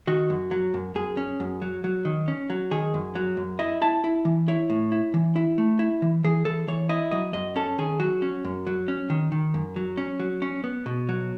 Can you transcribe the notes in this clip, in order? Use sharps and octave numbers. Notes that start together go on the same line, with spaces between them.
D#3 F#4
F#2
F#3
F#2
F#2 G#4
C#4
F#2
F#3
F#3
D#3
C#4
F#3
D#3 G#4
F#2
F#3
F#2
E4 D#5
E4 A5
E4
E3
E4 C#5
A2
E4
E3
E4
A3
E4
E3
E3 G#4
E3 A4
E3 C#5
E4 D#5
F#3 D#5
F#2 D#5
C#4 A4
D#3 G#4
F#3 F#4
C#4
F#2
F#3
C#4
D#3
D#3
F#2
F#3
C#4
F#3
C#4
B3
B2
F#3